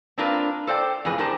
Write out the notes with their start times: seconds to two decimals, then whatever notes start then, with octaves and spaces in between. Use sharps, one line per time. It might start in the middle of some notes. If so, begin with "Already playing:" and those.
0.18 A#3 C4 D4 F4 A#4 B4
0.67 A4 C5 D5 F#5 G5
1.05 F2 A2 C#3 G#4 B4
1.18 A2 D4 G4 A#4 C5 A5